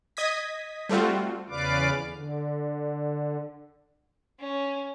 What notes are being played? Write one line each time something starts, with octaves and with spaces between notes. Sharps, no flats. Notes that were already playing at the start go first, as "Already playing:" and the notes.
D#5 D#6 G#6 B6
G3 A3 C4 F4 F#4
E2 C#3 B4 D5 F5 D6
D3
C#4